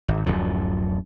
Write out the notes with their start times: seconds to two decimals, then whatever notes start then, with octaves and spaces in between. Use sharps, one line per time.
0.08 G#1
0.26 D1 F#2 F3